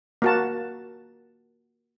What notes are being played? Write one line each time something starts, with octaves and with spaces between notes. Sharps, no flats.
A#3 F#4 A5